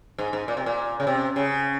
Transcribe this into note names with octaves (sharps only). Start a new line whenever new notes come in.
G#2
G#2
A#2
C3
A#2
C#3
C3
C#3